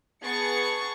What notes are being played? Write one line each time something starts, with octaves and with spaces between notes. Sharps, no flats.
B3 G#4 A5 C#6 C#7